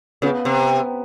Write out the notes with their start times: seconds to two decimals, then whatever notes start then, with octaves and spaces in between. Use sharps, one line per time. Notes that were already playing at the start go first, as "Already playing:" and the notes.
0.22 C#3 B3
0.45 C3